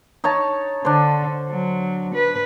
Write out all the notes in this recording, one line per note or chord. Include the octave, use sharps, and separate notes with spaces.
D#4 C#5 A5
D3 D4 C5
F#3
B4